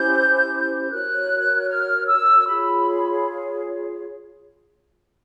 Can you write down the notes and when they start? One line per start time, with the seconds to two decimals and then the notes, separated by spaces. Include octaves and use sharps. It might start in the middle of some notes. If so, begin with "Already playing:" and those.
Already playing: C#4 E4 G4 C5 G6
0.90 F#4 A#4 C#5 F#6
1.68 F6
2.07 E6
2.47 F4 G#4 C#5 B5